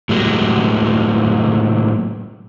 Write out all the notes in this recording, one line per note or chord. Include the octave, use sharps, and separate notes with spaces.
A2 F#3 G#3 A#3